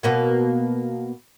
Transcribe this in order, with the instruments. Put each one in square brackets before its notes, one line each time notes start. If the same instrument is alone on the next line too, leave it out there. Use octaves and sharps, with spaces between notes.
[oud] B2 A#3 B3